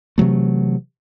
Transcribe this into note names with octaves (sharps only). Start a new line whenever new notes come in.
C3 E3 F#3 A3